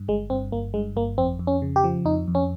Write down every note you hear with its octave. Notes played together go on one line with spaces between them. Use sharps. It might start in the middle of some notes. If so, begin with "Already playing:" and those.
Already playing: G2
G1 G#3
G2 C4
G1 A#3
G2 G#3
G1 A#3
F2 C4
F2
C#4
C#3
G4
F3
F2 D#4
F2
C#4